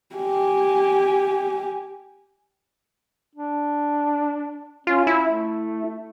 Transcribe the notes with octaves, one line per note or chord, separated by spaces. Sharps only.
G4 G#5
D4
C#4 F4
E4
A3